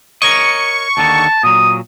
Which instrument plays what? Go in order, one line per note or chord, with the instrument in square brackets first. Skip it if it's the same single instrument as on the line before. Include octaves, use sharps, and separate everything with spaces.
[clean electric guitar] A#4 C#5 D#5 [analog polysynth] C#6
[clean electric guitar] D#2 D3 D#3 [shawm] A5
[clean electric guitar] A#2 F#3 [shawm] D#6